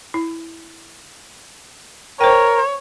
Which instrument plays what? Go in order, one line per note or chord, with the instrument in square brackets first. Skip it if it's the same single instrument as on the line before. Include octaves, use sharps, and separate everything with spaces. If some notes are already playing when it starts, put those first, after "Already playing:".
[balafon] E4
[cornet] A#4 [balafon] C5 G5 [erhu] C#5